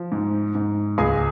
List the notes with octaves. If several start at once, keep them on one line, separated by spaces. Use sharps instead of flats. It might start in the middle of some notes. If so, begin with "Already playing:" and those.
Already playing: F3
G#2
G#2
C#2 G#4 G#5